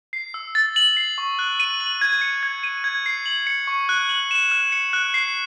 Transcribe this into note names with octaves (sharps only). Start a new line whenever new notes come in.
C7
E6
A6
F#7
C7
C#6
F#6
D#7
F#7
G#6
C#7
G#6
D#7
G#6
C7
F#7
C#7
C#6
F#6
F#7
E7
F#6
C#7
F#6
C7